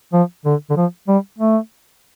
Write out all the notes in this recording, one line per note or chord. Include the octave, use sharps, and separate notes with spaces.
F3
D3
D3
F3
G3
A3